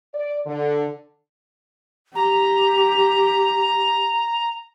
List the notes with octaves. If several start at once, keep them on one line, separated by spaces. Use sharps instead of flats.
D5
D3
G4 A#5